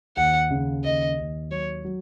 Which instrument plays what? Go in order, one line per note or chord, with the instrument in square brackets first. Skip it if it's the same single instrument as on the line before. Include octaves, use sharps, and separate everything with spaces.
[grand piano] D#2 [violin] F#5
[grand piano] C#3
[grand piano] D#2 [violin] D#5
[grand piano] D#2
[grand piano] F#3 [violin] C#5
[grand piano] F#3